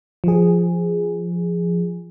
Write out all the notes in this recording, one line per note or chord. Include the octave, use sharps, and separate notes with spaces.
F3 G#4